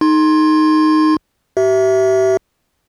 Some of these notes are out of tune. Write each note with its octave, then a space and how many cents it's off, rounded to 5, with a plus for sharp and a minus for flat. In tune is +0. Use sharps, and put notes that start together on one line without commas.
D#4 +0 C6 +15
G4 -40 E5 +0